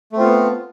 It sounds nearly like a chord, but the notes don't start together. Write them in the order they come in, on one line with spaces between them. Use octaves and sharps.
A3 C4 F4 B3